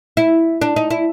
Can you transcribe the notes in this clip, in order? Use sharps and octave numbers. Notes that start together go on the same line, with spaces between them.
E4
D4
D#4
E4